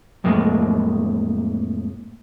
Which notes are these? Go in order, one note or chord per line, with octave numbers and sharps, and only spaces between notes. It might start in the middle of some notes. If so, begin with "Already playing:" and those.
F2 A2 G#3 A#3